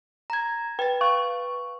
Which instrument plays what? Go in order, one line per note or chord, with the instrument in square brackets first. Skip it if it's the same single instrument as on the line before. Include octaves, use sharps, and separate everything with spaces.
[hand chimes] A#5 G#6
[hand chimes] B4 A6 [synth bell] G5
[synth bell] F5 C#6